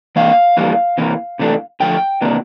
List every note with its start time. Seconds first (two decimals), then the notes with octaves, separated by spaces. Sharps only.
0.16 C3 E3 A#3 F5
0.57 F2 E3 G3 A#3
0.98 C3 E3 A#3
1.39 C3 E3 A3 D4
1.80 D3 F3 A3 G5
2.21 C3 E3 A#3 D4